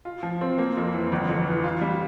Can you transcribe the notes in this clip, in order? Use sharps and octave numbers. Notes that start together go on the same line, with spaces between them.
F4
F3
C4
A#3
F2
E3
G1
F2
E3
F4
G3